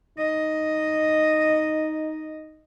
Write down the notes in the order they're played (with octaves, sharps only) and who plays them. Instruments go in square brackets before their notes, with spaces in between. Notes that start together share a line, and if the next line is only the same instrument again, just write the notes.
[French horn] D#4 [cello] D#5